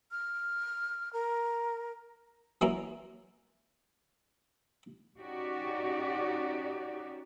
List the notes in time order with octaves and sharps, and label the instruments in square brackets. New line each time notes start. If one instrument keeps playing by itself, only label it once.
[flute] F6
A#4
[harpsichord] E3 F#3 A#3 C#4 E4
[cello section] C#4 D#4 F#4 G4 D5